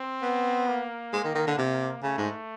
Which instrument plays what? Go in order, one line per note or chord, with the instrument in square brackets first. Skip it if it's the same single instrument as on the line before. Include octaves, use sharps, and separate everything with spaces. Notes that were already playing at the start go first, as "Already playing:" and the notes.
Already playing: [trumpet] C4
[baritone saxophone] B3
[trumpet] A#3
[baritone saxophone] G#3
D#3
D#3
D3
C3
[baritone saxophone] C#3 [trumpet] A3
[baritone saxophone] G#2